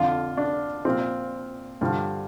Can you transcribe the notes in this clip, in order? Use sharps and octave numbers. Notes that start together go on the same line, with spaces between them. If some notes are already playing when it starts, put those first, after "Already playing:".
Already playing: F2 D3 F3 F4
D4
A#2 F3 C4
G2 D3 F3